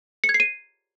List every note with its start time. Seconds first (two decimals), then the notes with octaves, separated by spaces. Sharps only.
0.24 C#7
0.29 G#6
0.34 C7
0.40 D#7